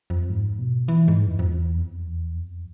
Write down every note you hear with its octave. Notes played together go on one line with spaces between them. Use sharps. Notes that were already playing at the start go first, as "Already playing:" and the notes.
F2
G#2
B2
E3
G#2
F2
F2
E2
F2
E2
F2